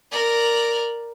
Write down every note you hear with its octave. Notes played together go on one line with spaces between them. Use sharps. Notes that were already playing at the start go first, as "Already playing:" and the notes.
A#4 D5